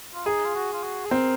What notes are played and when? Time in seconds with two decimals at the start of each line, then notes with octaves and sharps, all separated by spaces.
0.14 F4
0.26 D#4 G#4
0.45 F4
0.55 F#4
0.73 F4
0.83 F#4
1.05 G#4
1.11 C4 A#4